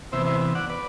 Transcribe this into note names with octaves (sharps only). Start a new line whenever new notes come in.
C3 E3 B3 C5 E5
C5 E5
D5 F#5
B4 D5